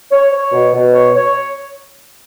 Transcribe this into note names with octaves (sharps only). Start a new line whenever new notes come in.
C#5
C#5
B2
B2
C#5
C#5